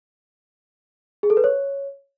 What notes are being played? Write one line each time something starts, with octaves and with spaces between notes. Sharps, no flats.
G#4
A4
B4
C#5